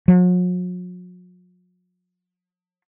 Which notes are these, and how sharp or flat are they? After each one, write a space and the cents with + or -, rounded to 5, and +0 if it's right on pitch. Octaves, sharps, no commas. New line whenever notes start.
F#3 -45